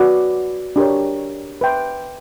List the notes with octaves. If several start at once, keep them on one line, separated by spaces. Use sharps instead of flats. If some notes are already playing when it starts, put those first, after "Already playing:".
Already playing: F#4 B4 D5
D4 G4 A#4 C#5
B4 E5 G5 C6